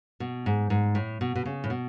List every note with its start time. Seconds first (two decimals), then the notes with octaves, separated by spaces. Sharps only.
0.20 B2
0.46 G#2
0.70 G#2
0.95 A2
1.21 B2
1.35 B2
1.45 C#3
1.64 A2
1.70 B2